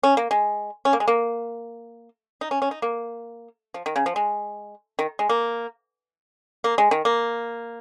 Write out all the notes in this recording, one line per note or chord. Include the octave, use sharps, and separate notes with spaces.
C#4
A#3
G#3
C#4
A#3
G#3
A#3
D#4
C#4
C#4
D#4
A#3
F3
D#3
C#3
F3
G#3
D#3
G#3
A#3
A#3
G#3
D#3
A#3